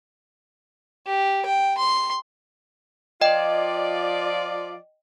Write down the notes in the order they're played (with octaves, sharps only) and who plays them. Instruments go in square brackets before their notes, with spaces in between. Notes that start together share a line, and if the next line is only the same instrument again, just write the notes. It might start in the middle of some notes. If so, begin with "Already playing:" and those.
[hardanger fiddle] G4
G5
C6
[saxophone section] F3 F4 D5 [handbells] D#5 G5